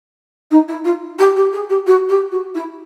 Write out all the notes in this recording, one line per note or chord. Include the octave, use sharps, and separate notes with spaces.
D#4
E4
F4
G4
G4
G#4
G4
F#4
G4
F#4
E4